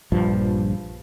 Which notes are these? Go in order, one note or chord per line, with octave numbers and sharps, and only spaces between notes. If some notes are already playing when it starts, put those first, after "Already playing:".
A#1 G2 F3